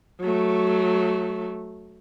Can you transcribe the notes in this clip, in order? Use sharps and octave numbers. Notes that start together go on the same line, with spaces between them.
F#3 A3